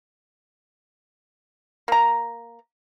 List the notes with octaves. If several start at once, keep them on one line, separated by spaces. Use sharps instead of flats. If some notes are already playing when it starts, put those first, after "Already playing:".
A#3 A#5